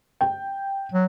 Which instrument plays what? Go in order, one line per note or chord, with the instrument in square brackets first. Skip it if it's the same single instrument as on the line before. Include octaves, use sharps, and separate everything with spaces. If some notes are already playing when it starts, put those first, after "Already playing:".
[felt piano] G5
[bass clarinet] F#3